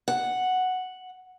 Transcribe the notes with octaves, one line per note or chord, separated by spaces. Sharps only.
F#5